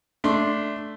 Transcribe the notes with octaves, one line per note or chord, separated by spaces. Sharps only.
A3 D4 C6